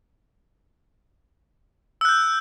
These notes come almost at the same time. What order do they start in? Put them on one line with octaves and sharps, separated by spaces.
E6 F#6 G6